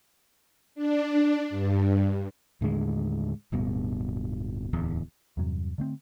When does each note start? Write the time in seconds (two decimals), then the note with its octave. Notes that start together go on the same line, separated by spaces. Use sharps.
0.75 D4
1.50 G2
2.61 D#2 A2 D3 G#3
3.52 D1 G2 B2
4.73 D1 E2
5.37 E2 G2 C3 F#3
5.78 D3 A3 C4